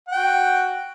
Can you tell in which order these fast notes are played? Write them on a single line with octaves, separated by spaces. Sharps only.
F#5 G5 F#4